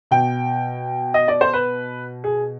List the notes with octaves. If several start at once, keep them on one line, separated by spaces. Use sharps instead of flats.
B2 G5
D#5
D5
C5
B4
G#4